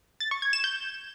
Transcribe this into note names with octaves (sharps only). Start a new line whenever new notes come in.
A6
C#6
G#6
E7
G6